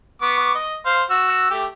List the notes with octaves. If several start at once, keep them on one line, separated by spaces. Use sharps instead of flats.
B3 C#6 D6
D#5
C5 F5
F#4 E6
A3 G4